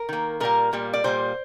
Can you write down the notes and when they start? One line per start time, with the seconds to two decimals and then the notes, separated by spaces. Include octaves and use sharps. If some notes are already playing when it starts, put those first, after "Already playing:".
Already playing: A#4
0.09 D#3 A#3
0.40 A#2 G3 A#3 A#4
0.73 A#2 G3 A#3
0.93 D5
1.04 A#2 G3 A#3 C5